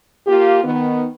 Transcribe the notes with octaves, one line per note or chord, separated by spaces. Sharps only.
A#3 F4 G4
D#3 B3